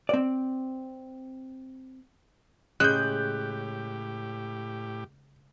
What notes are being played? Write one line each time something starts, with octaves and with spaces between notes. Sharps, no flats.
C4 D5
A2 C#3 G#3 G4 F#6 G6